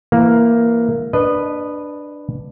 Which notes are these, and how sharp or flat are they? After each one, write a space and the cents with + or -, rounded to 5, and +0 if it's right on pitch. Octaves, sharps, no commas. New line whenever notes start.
E3 +20 A#3 +0
D4 +5 B4 +0 D#5 -20